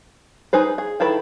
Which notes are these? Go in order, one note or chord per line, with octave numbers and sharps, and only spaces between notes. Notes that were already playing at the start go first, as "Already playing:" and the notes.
D#4 G#4 B4 C5
G#4
D#3 E4 A4 B4